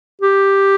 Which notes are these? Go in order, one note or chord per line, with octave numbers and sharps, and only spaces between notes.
G4